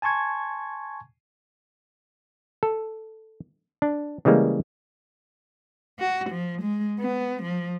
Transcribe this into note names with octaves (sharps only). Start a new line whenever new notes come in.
G#5 A5 C6 C#6 G#6
A4
D4
C#3 E3 G3 G#3 A#3
F#4
F3
G#3
B3
F3